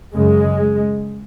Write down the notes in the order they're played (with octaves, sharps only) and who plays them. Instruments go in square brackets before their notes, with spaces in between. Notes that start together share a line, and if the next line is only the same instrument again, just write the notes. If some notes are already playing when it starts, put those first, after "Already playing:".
[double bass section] F#2 C#3 G#3